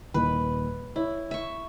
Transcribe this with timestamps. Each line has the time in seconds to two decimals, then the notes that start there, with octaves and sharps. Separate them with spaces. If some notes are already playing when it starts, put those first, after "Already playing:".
0.14 D#1 A#2 D#3 B4
0.96 E4 C#5
1.31 E5 C#6